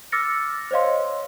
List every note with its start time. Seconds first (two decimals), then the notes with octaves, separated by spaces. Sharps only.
0.12 D6 E6 F6 A6 A#6 C#7
0.71 C5 C#5 D#5 F5 C6